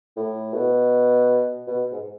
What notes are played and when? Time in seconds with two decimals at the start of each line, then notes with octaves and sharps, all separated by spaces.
0.17 A2
0.54 B2
1.67 B2
1.92 G#2